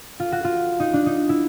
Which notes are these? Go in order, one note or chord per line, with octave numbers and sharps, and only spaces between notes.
F4
F#4
F4
D#4
D4
D#4
E4